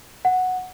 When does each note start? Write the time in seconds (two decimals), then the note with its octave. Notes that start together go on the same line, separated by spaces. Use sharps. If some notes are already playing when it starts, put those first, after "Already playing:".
0.25 F#5